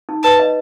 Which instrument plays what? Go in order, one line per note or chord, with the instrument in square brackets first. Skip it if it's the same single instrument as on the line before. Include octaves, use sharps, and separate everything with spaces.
[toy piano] D#4
[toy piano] B4 [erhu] A5
[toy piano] D#5